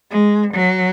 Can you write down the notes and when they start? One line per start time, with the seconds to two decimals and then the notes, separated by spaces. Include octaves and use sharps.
0.10 G#3
0.54 F#3